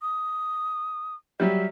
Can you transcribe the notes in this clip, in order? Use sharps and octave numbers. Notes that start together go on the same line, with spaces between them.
D#6
F#3 G3 E5